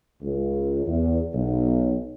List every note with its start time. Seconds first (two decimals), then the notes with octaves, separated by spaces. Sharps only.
0.22 C#2
0.87 E2
1.35 B1